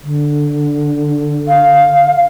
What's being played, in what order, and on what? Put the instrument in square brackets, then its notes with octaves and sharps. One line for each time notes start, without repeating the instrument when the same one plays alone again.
[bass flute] D3
[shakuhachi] F5